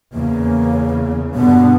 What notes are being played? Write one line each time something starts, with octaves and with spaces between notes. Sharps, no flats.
E2 C#3 A#3
G2 B2 D3 B3